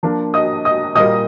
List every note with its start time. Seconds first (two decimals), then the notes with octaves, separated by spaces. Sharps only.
0.03 F3 A#3 D4
0.34 D#5 D#6
0.65 D#5 D#6
0.95 A#2 G3 A#3 D#5 D#6